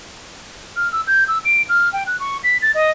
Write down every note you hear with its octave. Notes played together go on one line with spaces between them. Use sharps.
F6
E6
G6
E6
D7
F6
G5
F#6
C#6
B6
A6
D#5